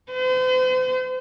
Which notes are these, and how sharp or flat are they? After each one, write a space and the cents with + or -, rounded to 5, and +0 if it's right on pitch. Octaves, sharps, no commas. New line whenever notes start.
C5 -40